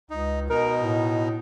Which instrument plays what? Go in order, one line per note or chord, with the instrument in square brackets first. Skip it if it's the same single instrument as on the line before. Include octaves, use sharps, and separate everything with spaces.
[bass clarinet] C#2 [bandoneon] D#4
[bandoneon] B2 D#4 [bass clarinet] A#4
[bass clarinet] A2